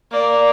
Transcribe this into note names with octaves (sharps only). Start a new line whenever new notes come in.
A#3 D5